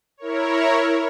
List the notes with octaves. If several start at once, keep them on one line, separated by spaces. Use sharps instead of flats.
E4 A#4 C#5